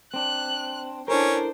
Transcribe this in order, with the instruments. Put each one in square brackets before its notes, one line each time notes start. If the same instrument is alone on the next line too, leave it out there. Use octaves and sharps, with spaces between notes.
[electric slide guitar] C4 D4 [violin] F#6
[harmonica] C#4 [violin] D4 C5 [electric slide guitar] E4 A4 A#4